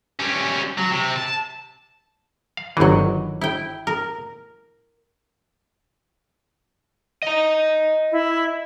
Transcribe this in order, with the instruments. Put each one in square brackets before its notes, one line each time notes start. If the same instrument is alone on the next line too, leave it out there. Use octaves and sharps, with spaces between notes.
[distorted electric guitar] G3 C#4
F#3
C3
A5
[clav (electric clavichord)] F5
[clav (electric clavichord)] G1 E3 [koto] D#3 F#3
[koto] E4 G5
A#4
[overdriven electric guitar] D#5 A#5
[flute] E4